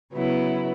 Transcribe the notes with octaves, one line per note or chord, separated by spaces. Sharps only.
C#3 F#3 B3 E4